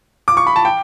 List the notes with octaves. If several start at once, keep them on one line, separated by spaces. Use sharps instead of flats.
D6
C#6
B5
A5
G5